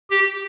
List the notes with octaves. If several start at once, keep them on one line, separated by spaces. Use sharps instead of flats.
G4